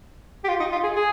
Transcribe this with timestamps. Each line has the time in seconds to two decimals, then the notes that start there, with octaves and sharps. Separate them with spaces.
0.44 G4
0.49 F4
0.60 D#4
0.72 F4
0.83 G#4
0.96 G#4